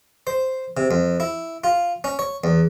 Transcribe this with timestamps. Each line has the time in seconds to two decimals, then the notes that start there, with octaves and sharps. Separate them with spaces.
0.27 C5
0.77 C3
0.91 F2
1.20 E4
1.64 F4
2.04 C#4
2.19 C#5
2.44 E2